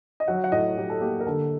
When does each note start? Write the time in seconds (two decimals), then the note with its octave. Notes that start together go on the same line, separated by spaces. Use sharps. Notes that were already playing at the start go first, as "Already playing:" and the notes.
0.20 D#5
0.28 F#3 F#5
0.44 F#5
0.52 A2 D#5
0.77 A2 G4
0.90 A4
1.01 A#3 G4
1.20 A#4
1.26 D3 A4